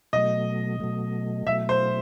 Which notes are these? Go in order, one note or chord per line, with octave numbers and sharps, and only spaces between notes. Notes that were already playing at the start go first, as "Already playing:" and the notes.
B2 F#3 A3 D#5
B2 F#3 A3
B2 F#3 A3 E5
C5